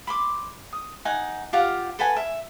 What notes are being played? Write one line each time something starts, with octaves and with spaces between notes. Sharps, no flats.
B5 C6 D6
D#6
D#4 F#5 G#5
F4 G4 F5 F#5
A4 B4 F#5 G#5
E5